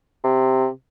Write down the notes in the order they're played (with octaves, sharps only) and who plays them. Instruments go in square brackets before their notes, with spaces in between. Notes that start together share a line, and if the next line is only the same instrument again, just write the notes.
[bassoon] C3